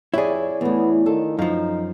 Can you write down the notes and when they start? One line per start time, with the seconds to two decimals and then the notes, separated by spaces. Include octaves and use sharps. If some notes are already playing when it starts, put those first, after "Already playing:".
0.14 F2 E4 G4 G#4 B4 C#5 D5
0.61 E2 A3 B3
1.06 D#3 F4 A4
1.39 F#2 F3 D#4 F5